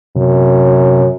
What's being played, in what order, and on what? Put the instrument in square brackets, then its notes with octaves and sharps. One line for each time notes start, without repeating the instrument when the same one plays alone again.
[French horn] F#2 [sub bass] C3